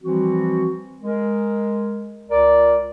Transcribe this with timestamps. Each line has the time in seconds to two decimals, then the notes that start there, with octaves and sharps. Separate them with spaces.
0.02 E3 F3 G3 C4 F#4
1.03 G#3 A#4
2.29 C#2 A#4 D5